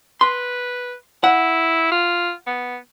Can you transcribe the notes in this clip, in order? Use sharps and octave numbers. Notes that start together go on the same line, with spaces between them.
B4 C6
E4 F#5
F4
B3